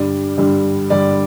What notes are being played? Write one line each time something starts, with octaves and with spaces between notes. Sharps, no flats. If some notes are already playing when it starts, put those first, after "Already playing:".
Already playing: G2 D3 G3 D5
G2 D3 G3
G2 D3 G3 D5